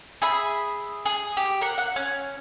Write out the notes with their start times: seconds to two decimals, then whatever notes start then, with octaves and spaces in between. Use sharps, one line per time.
0.22 G#4 E5 B5
1.05 G#4
1.37 G4
1.61 A#4 F#5
1.78 F#5
1.96 C#4